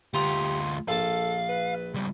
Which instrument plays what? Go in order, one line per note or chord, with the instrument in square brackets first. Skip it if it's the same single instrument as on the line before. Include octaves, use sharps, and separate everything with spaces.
[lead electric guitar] D2 F4 [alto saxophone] G4 [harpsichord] F#5 A#5 C6
[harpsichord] A#1 A5 [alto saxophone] A4 [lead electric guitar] F5
[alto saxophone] B4
[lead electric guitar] C#2 G3